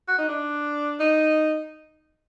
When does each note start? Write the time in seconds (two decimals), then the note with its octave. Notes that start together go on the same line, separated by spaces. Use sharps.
0.08 F#4
0.18 D#4
0.28 D4
1.00 D#4